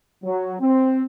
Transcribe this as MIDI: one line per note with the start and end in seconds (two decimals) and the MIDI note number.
0.24 0.55 54
0.60 1.03 60